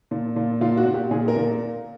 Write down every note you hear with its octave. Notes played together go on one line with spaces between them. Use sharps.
A#2
A#2
A#2 F4
F#4
A#2
G4
A#2 G#4
A#4
A#2